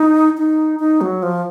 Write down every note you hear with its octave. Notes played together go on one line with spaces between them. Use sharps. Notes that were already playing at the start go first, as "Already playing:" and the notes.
Already playing: D#4
D#4
D#4
F#3
F3